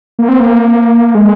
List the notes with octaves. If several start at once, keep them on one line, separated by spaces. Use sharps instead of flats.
A#3
C4
A#3
G#3